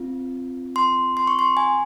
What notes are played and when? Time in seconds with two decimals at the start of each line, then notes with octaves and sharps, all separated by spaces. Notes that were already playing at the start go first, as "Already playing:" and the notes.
Already playing: C4 F4
0.76 C6
1.17 C6
1.27 C#6
1.39 C6
1.57 G#5